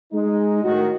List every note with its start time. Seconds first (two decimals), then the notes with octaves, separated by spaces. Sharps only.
0.13 G#3 D#4
0.63 A2 D#3 F#4